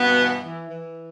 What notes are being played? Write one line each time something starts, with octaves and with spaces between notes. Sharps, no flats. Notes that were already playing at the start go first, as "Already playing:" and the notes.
Already playing: G2 B2 B3
E3
E3
E3